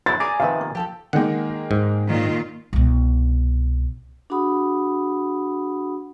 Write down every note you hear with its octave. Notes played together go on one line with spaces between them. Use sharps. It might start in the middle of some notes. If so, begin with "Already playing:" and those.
F#3 B3 E4 A6
G#4 D5 G#5 A#5 D6
C3 D#3 F3 B4 E5 F5
A#3
F3 G4 A4
D#3 G#3 A#3 F#5 G5
G#2
A#2 D#3 F4
C2 B2
D4 F#4 G#4 F#5 B5 D#6